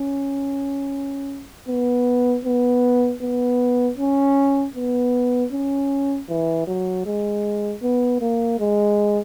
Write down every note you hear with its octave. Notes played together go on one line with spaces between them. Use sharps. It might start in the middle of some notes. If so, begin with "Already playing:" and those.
Already playing: C#4
B3
B3
B3
C#4
B3
C#4
E3
F#3
G#3
B3
A#3
G#3